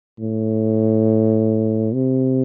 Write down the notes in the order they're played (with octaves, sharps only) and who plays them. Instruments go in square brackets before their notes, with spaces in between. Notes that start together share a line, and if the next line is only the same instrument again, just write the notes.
[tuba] A2
C3